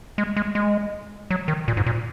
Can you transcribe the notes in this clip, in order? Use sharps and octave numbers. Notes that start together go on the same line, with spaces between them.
G#3
G#3
G#3
F#3
D#3
A#2
G#2
A#2